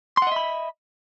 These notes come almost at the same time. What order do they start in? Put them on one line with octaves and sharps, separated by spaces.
C6 F#5 D#5 E5 B5